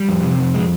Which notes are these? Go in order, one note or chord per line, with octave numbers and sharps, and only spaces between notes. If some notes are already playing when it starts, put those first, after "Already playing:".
Already playing: G3
F2
C3
F2
G#3